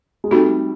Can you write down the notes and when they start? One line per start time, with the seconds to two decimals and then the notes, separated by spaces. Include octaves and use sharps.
0.24 G#3
0.31 G3 A3 C4 D#4 F#4